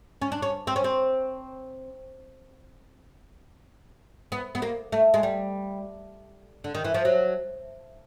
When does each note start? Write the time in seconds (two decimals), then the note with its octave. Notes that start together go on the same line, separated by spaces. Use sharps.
0.22 C#4
0.32 D4
0.42 C#4
0.67 C4
0.76 C#4
0.84 C4
4.32 B3
4.55 B3
4.62 A#3
4.92 A3
5.14 G#3
5.23 G3
6.64 D3
6.75 D#3
6.85 E3
6.94 F3
7.05 F#3